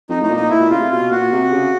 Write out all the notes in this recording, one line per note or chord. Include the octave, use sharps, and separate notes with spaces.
F2 D#4
A2 D#4
A#2
D#4
A2 E4
A#2
C#3 F4
C3
B2 F4
A#2 F#4
C3
C#3